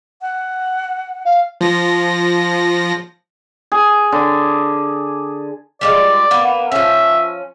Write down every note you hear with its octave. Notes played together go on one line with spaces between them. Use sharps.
F#5
F5
F3 A#6
G#4
D3
G3 G#3 F4 D5
A#3 B3
F3 C#4 E5